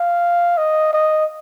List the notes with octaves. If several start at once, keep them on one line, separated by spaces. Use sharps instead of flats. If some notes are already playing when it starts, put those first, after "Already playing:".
Already playing: F5
D#5
D#5